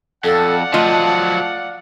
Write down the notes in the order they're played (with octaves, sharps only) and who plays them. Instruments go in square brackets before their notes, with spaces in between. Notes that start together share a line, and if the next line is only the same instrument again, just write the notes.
[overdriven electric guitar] F2 [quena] A4 [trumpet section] D5 F5 F#5
[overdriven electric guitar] F3 F#3 [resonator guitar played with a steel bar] A3 F4 D#5 [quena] A5